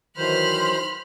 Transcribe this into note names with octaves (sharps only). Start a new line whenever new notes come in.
D#3 E3 F#3 C5 B5 C6 F6 F#6